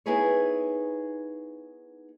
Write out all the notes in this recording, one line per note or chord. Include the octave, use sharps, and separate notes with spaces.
B3 D#4 E4 G#4 B4 C#5